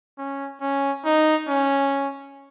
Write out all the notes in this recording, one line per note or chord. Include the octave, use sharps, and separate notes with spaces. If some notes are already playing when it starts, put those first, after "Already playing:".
C#4
C#4
D#4
C#4